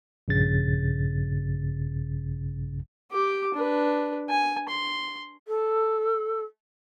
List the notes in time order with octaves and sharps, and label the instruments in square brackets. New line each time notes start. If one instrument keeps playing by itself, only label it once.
[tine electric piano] A#1 G2 C#3 A6
[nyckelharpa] G4 D6
D4 B4
G#5
C6
[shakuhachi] A4